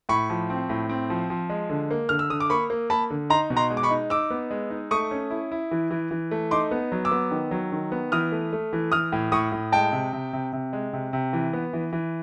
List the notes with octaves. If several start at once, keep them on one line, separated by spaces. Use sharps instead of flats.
A2 B5 C#6
F3
C4
A2
C4
F3
F3
G#3
D3
A#3
D3 F6
E6
D3 D#6
D6
A#3 B5 C#6
A#3
A#3 A5 B5
D3
D#4 A#5 C6
B2
A#5 C6
G#3
D6
B5 C#6
D#4
D#4 D6 E6
B3
G#3
D#4
A3 C#6 D#6
C#4
E4
E4
E3
E3
E3
A3
D#4 C6 D6
B3
F#3
D6 E6
B3
D#3
F#3
D#3
B3
E3 D#6 F6
A3
A3
E3
E3 D#6 F6
A2
A2 C#6 D#6
A2
G#3 G5 A5
C3
C3
C3
C3
G#3
C3
C3
E3
B3
E3
E3